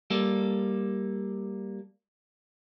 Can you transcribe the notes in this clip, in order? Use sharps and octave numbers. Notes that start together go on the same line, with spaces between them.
G3 A#3 A4